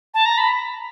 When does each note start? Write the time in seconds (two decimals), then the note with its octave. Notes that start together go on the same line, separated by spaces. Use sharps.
0.14 A5
0.26 A#5
0.38 B5